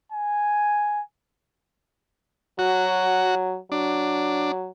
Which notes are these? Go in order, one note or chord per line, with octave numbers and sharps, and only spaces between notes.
G#5
F#3 F#4
F#3 D4